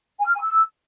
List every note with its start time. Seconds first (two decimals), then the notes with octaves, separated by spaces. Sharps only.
0.20 G#5
0.27 F6
0.34 G#5
0.41 E6